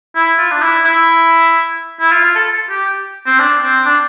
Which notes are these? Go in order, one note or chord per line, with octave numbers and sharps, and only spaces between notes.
E4
F4
D4
E4
E4
E4
F4
F4
A4
G4
C4
D4
C4
D4